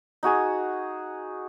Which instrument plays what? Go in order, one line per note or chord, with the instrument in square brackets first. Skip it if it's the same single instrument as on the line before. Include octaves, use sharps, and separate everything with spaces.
[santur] D#4 F#4 G#4 G#5